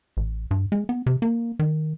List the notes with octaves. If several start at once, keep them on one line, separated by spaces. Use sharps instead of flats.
A1
G2
G#3
B3
C3
A#3
D#3